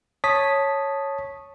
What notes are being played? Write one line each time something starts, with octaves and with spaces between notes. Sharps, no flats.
C#5 A5 D#6 B6